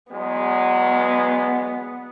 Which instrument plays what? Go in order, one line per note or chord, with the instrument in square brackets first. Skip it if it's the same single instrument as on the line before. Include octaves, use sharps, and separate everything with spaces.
[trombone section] E2 F#3 G#3 [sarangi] B3